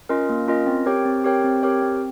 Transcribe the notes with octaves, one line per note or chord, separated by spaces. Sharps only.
C#4 F4 A#4 D#5
A#3
C#4 F4 A#4 D#5
C4
G4 A#4 C#5 G5
C4
G4 A#4 C#5 G5
C4
G4 A#4 C#5 G5
C4